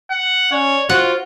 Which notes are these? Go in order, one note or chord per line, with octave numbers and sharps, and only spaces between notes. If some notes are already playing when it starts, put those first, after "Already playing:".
F#5
C#4 C#5 D5
F4 F#4 C5 F#5